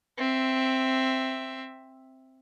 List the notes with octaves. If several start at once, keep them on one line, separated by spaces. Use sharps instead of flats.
C4 E5